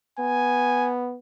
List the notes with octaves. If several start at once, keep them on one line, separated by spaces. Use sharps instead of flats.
B3 G#5